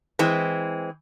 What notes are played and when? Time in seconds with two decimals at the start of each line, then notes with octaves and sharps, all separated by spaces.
0.19 E3 G#3 C4